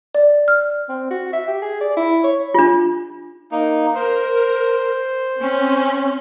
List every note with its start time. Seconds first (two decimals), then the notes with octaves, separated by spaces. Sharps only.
0.15 D5
0.48 F6
0.89 C4
1.11 F#4
1.33 E5
1.48 G4
1.62 G#4
1.81 D5
1.97 E4
2.24 C#5
2.54 D4 F4
3.52 A#3 D#4
3.95 A#4 C5
5.41 C4 C#4